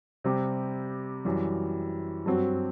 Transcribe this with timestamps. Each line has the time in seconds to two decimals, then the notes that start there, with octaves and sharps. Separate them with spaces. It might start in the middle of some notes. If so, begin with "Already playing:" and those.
0.24 C3 G3 C4 G4
1.25 F#2 E3 G3
2.26 G2 F#3 C4 F#4